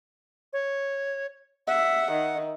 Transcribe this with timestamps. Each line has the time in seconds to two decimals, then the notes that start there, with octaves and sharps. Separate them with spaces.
0.53 C#5
1.67 E5 F#5
2.12 D#3